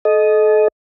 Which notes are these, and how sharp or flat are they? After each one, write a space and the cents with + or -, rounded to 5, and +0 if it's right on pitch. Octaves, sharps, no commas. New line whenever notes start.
A4 -35 D#5 +0